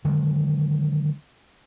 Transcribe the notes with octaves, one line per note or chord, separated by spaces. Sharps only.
D3 D#3 F#3 G#3